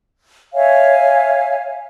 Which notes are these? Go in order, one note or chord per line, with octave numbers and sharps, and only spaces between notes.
C#5 E5 F5 G#5